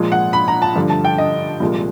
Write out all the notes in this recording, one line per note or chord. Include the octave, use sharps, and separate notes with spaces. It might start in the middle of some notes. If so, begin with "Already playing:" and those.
Already playing: A#2 F3 G#3
F#5
B5
A#5
A5
G2 D3 F3 A3
A5
G5
D#5
C2 A#2 F3 G#3